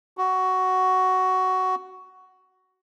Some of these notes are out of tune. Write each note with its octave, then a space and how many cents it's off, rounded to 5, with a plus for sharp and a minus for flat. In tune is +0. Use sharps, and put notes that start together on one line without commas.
F#4 +10